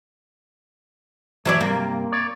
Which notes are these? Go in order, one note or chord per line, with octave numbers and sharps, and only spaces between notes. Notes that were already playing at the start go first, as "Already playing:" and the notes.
E3 F#3 A3 C#5 D5 E5
G2 C3 A#3
C#5 D5